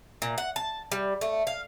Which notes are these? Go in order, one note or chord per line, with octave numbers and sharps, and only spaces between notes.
A#2
F#5
A5
G3
A3
F5